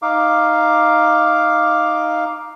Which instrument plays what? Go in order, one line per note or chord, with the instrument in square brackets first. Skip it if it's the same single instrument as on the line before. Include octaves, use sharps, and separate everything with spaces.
[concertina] D#4 F5 D6